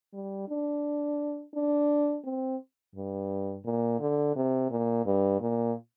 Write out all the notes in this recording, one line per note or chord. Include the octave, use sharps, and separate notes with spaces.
G3
D4
D4
C4
G2
A#2
D3
C3
A#2
G2
A#2